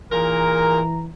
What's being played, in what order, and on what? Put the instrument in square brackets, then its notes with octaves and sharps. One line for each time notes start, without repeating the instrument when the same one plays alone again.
[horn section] A#2 G#4 A#4 [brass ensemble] E3 A#5